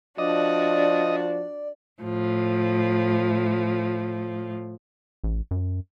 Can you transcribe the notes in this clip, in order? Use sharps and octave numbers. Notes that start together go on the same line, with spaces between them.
F3 D4 F#4 D5 D#5
A2 F3
A1
F#2